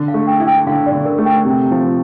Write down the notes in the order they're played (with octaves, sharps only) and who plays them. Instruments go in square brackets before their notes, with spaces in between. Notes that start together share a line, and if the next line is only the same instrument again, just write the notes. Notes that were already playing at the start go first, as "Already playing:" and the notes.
Already playing: [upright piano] D3
[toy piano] F5
[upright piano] A3
[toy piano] G5
[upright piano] E4
[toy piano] G5
[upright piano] D3 [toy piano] F5
[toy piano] D5
[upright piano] D3
[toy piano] A#4
[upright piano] A3
[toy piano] G5
[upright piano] C3
F3